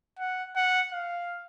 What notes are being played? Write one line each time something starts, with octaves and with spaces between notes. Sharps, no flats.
F#5
F#5
F5